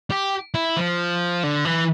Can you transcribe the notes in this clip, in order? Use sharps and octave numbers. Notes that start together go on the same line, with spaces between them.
G4
E4
F3
D3
E3